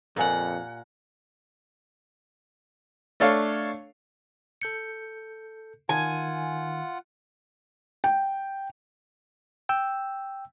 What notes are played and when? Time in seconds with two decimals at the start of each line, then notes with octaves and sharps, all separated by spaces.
0.16 F2 A#2 G4 A#4 F#5 G#5
3.20 A3 D4 A4 C#5 F5
4.62 A4 G6 C#7
5.89 D#3 F4 F#5 G#5
8.04 G5
9.69 G5 E6